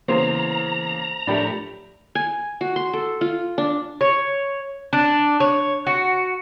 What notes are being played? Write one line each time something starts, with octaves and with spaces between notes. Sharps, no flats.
C#3 E3 A#3 B3 G#4 C5 A#5
A2 F3 A3 D4 G4 A#4 B5
G#5
F#4
C6
A4
F4
D4
C#5
D4
C#5
F#4